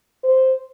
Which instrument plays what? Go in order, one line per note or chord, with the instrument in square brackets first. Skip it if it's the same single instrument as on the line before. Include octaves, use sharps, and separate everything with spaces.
[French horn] C5